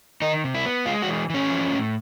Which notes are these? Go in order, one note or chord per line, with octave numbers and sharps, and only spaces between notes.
D#3 D#4
C3
E4
B3
G#3 F4
F#4
E3
E3 C#4
F3
A2